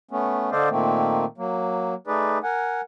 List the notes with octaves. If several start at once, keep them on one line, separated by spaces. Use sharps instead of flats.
A3 B3 C#4
D3 A4 C5 D5 D#5 F5
A#2 D#3 A3 A#3 C4
F#3 A#3
A3 D#4 G#4 B4 D5
A#4 F#5 G#5